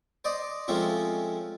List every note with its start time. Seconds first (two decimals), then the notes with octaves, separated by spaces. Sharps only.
0.25 C5 D5 D#5
0.68 F3 G#3 A3 C4 C#4 F4